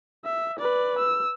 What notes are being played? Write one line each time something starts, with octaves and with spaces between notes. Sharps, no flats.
E5
B4 D5
E6